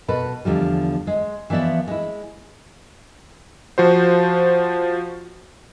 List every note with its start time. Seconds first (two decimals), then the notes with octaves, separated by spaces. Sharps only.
0.08 B2 A4 B4
0.45 E2 D3 F3 G3
1.07 G#3
1.50 E3 F3 B3 D5 E5
1.88 G#3 E4
3.78 F3 F#4 C5